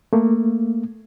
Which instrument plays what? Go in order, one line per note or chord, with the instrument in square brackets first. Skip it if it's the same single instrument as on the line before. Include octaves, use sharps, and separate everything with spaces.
[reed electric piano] A3 A#3